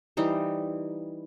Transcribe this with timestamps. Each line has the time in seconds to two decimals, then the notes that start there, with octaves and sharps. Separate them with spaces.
0.17 E3 G3 D#4 C5